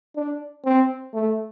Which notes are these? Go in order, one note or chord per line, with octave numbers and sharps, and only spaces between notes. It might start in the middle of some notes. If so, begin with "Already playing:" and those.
D4
C4
A3